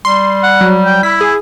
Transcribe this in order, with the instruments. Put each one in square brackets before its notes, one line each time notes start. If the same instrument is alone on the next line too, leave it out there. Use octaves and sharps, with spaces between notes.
[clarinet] G3 [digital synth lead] C6
[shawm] F#5
[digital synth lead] F#3
[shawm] G5
[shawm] E4 [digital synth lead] B6
[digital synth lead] G#4